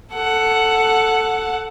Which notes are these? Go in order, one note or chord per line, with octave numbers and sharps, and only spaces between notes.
A4 F#5